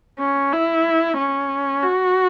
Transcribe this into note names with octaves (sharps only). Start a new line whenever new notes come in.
C#4
E4
C#4
F#4